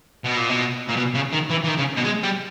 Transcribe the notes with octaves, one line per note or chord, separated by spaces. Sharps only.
B2
A#2
B2
A#2
B2
C#3
D#3
E3
E3
D#3
C#3
B2
G#3
G3